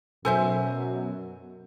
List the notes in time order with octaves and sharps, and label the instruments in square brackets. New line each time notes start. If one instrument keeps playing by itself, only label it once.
[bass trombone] F#2 [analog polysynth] B2 F#3 [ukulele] A4 C5 E5 [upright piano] G#5